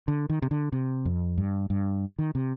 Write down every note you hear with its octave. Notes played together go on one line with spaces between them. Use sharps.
D3
D#3
C3
D3
C3
F2
G2
G2
D#3
C3